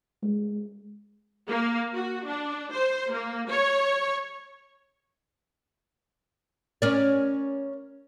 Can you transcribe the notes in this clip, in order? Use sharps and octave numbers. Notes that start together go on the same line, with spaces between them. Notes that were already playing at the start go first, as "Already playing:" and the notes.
G#3
A#3
F#4
D4
C5
A#3
C#5
C#4 A#4 D5